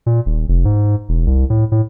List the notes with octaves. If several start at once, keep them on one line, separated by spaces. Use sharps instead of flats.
A#2
D#1
F1
G#2
E1
C2
A2
A2